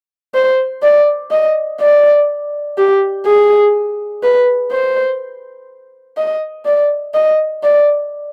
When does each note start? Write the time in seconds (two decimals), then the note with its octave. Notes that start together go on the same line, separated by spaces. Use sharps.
0.35 C5
0.82 D5
1.31 D#5
1.81 D5
2.78 G4
3.26 G#4
4.23 B4
4.72 C5
6.17 D#5
6.65 D5
7.14 D#5
7.63 D5